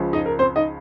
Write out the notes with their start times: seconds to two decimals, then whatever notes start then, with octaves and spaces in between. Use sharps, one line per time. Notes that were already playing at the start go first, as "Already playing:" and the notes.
Already playing: C#2 C#3 F3
0.13 D#4 D#5
0.26 A#4
0.39 C4 C5
0.56 D#4 D#5